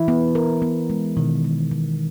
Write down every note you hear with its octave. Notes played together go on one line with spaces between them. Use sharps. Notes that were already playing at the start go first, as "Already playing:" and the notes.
Already playing: E3 E4
B3
A#4
B3
G#3
B2 D#3
G#3
E3